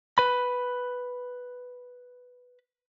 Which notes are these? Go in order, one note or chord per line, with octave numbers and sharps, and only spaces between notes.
B4 B5